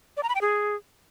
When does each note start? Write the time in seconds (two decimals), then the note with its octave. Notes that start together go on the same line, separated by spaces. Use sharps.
0.17 D5
0.23 A#5
0.29 B5
0.35 G5
0.41 G#4